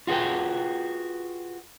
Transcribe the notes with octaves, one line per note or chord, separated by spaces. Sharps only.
F4 F#4 G#4 B4 G5